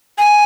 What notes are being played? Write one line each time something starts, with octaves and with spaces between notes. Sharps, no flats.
G#5